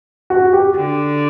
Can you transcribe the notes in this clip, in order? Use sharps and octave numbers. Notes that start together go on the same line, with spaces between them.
F#4
G4
D3